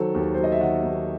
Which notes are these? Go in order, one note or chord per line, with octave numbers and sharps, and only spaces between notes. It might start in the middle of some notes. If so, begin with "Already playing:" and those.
Already playing: D#3 F#3 A4 C5
D#2
F#3 C5
D#5
E5
D#3 D#5 F#5
D#2